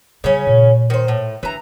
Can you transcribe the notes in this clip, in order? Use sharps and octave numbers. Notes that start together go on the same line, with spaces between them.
C#3 G3 C#4
A#2
D#3 C5
A2
E3 D4 A#5